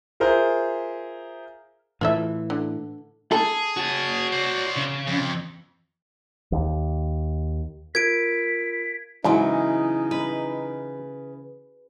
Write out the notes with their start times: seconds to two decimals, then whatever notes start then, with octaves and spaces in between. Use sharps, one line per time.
0.20 F4 G#4 A#4 C5 E5
2.01 A2 E3 F4 A4 E5
2.50 D3
3.32 G#4 A4
3.77 F#4 C#5 A5
4.32 C5 D5
4.76 C#3
5.08 F2
6.52 D#2
7.95 F4 A#4 G#6 B6 D7
9.24 G#2 C#3 E3 F#3 D#4
10.11 B4 B5